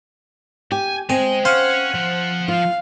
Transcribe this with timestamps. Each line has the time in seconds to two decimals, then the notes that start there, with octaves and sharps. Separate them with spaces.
0.72 G4 G#5
1.10 G#3 C4 G#5
1.45 C#4 C5 F5 F#5
1.95 F3
2.48 F4 F5